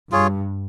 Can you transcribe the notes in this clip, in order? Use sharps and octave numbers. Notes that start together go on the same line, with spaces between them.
G2 F4 G#4 C#5